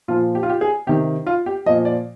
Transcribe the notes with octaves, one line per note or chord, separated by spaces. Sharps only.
A#2 F3 F4
G4
F4
G4
G#4
C3 D#3 G4
F4
G4
A#2 F3 D#5
D5